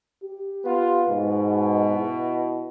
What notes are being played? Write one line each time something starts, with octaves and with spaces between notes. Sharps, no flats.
G4
B3 F4
G#2 B2
E4